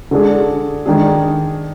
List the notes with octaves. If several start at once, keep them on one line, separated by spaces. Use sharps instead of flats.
D3 G#3 D4 G#4
D#3 G#3 D4 G#4